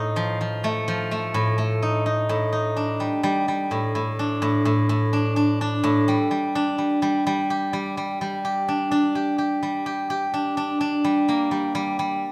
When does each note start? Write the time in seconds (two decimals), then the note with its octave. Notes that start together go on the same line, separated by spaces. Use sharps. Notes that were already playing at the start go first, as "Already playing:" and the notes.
Already playing: A2 D#4
0.16 F3
0.41 F3
0.64 A3
0.88 F3
1.11 A3
1.34 A2
1.58 A3
1.82 D#4
2.06 D#4
2.29 A2
2.53 D#4
2.77 D4
3.00 G3
3.23 G3
3.48 G3
3.71 A2
3.95 A2
4.19 D4
4.42 A2
4.65 A2
4.89 A2
5.13 D4
5.36 D4
5.61 D4
5.84 A2
6.08 G3
6.31 G3
6.55 D4
6.78 G3
7.02 G3
7.27 G3
7.50 G4
7.73 G3
7.97 G3
8.21 G3
8.45 G4
8.68 D4
8.91 D4
9.15 G4
9.38 G4
9.63 G3
9.86 G4
10.10 G4
10.34 D4
10.57 D4
10.81 D4
11.04 G3
11.29 A#3
11.51 G3
11.75 G3
11.99 G3